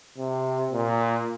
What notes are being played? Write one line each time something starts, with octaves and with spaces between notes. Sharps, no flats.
C3
A#2